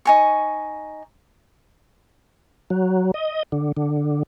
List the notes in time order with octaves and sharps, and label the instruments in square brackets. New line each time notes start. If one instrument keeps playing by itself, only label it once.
[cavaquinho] D#4 G#5 C#6
[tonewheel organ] F#3
D#5
D3
D3